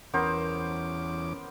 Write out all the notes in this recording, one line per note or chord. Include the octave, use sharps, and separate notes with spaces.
E2 B3 C#4 A#4 C5 D6